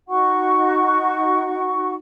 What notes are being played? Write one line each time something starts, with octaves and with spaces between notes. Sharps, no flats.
D#4 F#4 F#5 C#6